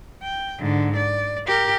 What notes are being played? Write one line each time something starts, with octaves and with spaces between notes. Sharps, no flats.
G5
G#2 D3
D5
G4 A#4